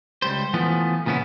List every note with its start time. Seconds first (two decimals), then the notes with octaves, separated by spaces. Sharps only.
0.22 C#2 G3 C5
0.54 E3 F3 A3 B3
1.06 A#2 C#3 B3 C#4 E4